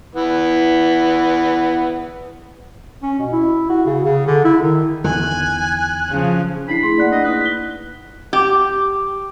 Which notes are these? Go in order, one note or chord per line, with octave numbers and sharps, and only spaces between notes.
E3 B3
C#4
B2
E4
F#4
C#3
C#3
D3
E4
D#3
E2 D3 D#3 G#5 F#6
C#3 F3
D4 E4 B5 C7
A3 E4 G#4 C6
A#3 D4 D5 F#5 F#6
D#5
D#4 E4 B4
B6 G7
G4